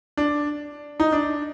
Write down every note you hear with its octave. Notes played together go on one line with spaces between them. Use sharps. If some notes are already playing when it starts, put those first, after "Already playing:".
D4
D#4
D4